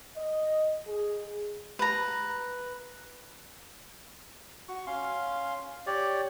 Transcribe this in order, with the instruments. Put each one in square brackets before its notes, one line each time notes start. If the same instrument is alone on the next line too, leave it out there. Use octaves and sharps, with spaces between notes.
[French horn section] D#5
G#4
[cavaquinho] B4 A#5
[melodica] F#4 C#6
C#4 F5 C6
G4 C#5 D5